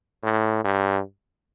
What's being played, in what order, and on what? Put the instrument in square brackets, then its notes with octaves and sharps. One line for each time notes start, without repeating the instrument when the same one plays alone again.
[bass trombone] A2
G2